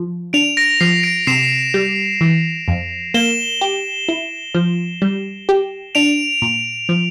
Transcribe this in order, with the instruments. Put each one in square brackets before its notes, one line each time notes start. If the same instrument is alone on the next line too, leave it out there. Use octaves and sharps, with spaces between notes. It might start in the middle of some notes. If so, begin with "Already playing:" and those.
Already playing: [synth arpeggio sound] F3
[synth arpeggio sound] D4 [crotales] D7 F7
[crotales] A#6 D7
[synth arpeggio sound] F3 [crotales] C7
[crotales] A#6 D7
[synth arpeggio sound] C3 [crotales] C7 E7
[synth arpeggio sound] G3
E3
F2
[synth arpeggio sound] A#3 [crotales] E7 G7
[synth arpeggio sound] G4
E4
F3
G3
G4
[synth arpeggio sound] D4 [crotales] D7 F7
[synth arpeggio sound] A#2
F3